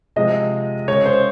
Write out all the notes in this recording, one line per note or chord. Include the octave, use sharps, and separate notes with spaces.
C3 F3 G#3 D#5
C#3 G#3 C#5
C5